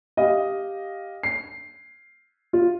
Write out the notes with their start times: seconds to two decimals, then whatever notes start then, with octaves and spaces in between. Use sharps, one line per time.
0.17 G4 D#5 F5
1.23 C7
2.53 F4